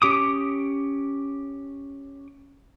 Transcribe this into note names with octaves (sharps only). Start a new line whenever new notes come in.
C#4 G4 D6 D#6